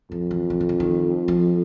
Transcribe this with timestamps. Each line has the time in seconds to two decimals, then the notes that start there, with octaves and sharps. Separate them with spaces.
0.11 F2 F3
0.31 E3
0.50 E3
0.61 D#3
0.69 D3
0.80 D#3
1.28 F3